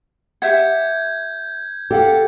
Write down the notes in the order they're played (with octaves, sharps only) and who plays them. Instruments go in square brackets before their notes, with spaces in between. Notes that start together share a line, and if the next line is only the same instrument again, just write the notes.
[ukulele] G4 E5 F#5 [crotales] G6 G#6
[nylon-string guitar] G4 [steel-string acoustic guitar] A4 F5 F#5